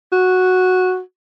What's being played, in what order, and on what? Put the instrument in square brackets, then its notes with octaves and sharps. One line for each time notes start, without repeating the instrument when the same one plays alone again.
[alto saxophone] F#4